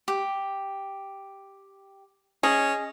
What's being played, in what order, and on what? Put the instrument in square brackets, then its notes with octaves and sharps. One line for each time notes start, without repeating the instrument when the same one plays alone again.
[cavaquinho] G4
[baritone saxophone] C#4 [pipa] G#4 [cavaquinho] D#5